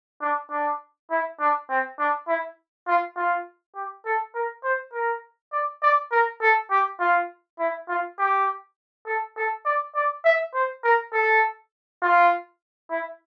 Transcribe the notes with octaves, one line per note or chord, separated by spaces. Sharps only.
D4
D4
E4
D4
C4
D4
E4
F4
F4
G4
A4
A#4
C5
A#4
D5
D5
A#4
A4
G4
F4
E4
F4
G4
A4
A4
D5
D5
E5
C5
A#4
A4
F4
E4